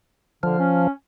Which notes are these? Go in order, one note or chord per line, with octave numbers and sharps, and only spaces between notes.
D3 F3
C#4